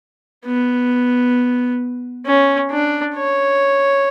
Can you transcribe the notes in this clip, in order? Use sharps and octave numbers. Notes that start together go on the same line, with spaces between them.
B3
C#4
D4
C#5